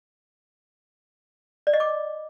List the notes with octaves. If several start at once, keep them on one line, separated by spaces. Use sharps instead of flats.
D5
D#5
D6